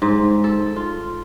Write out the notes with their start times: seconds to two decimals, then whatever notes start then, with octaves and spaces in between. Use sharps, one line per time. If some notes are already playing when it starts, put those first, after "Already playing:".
0.02 G#2
0.44 A4
0.76 F4